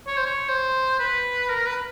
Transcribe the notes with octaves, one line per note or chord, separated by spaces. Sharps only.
C#5
C5
C#5
C5
B4
A#4
B4